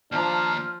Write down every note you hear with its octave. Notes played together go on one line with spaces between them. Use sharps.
D#2 F3 D4 A#5 F6